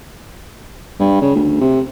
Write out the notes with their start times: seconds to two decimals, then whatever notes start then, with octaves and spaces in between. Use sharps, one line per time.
1.00 G2
1.21 C#3
1.35 D2
1.61 C3